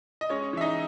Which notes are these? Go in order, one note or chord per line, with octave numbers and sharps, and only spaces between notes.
D#5
G#3 C#4 C#5
E3 E5
D#4 D#5